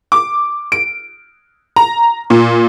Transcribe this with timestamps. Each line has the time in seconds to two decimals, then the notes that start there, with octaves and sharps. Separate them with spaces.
0.12 D6
0.72 D7
1.76 A#5
2.30 A#2